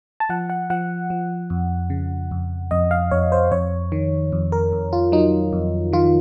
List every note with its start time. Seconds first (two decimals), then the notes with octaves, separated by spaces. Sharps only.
0.20 A5
0.29 F3 F#5
0.50 F#5
0.70 F3 F#5
1.10 F3
1.50 F2
1.90 C#3
2.31 F2
2.71 F2 D#5
2.91 F5
3.11 F2 C#5
3.32 C5
3.52 F2 C#5
3.92 D#3
4.32 F2
4.52 A#4
4.72 F2
4.93 F4
5.12 F#3 D#4
5.53 F2
5.93 D#3 F4